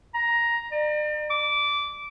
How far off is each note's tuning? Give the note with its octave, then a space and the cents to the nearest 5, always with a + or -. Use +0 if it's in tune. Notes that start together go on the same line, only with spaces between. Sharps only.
A#5 +10
D5 +40
D6 -15